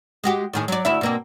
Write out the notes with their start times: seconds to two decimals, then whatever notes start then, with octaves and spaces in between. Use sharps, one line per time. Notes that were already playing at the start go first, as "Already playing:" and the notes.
0.24 G#3 F#4 G4
0.53 A2 D#3 G#4
0.68 F#3 D5
0.85 D2 E4 E5
1.01 B2 A#3 C4